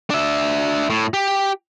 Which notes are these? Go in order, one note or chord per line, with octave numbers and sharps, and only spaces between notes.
D4 E5
A2
G4